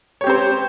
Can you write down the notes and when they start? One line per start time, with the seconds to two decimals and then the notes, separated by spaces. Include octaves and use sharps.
0.21 C#5
0.24 G4
0.27 C4
0.30 C5